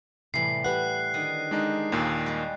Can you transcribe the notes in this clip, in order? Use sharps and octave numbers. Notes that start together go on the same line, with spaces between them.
A2 C3 E3 G3 C7
G4 B4 F#5 F#6
D3 D#3 D#5
G#3 D4 D#4
D#2 A#2 D#3 D#5
G3 G#3